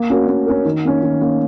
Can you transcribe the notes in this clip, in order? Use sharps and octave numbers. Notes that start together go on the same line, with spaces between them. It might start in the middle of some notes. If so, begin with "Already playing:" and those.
Already playing: A#3
C#4 F#4 A#4
A#3
C#4 F#4 A#4
D#3
A#3 C#4
D#3
A#3 C#4